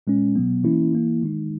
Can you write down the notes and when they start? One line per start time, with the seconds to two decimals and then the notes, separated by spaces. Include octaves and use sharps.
0.07 A#2 G#3 C#4
0.36 B2 F#3 B3
0.64 E3 A#3 C#4 E4
0.93 E3 A#3 E4
1.22 D#3 G#3 D#4